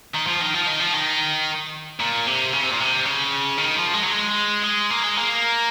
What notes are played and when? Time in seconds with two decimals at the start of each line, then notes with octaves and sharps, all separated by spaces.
0.15 D#3
0.27 F3
0.41 D#3
0.54 F3
0.67 D#3
0.80 F3
0.93 D#3
2.00 A#2
2.26 C3
2.53 C#3
2.62 C3
2.71 A#2
2.80 C3
3.05 C#3
3.58 D#3
3.76 F3
3.94 G#3
4.03 F#3
4.12 G#3
4.64 G#3
4.90 A#3
5.03 G#3
5.17 A#3